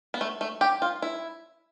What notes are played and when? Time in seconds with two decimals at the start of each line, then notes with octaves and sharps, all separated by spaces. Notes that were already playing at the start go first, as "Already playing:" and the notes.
0.14 B3
0.21 A3
0.41 A3
0.61 G4
0.82 F4
1.02 E4